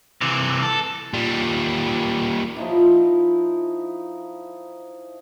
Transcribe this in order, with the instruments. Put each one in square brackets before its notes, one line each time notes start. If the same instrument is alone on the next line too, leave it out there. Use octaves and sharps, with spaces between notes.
[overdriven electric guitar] C3 E3
A4
A#2 G3
[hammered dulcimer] F3 D#4 E4